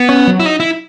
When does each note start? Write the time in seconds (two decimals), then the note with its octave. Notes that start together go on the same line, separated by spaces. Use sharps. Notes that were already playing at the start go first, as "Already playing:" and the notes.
Already playing: B3
0.09 C#4
0.27 F#3
0.40 E4
0.46 D#4
0.60 E4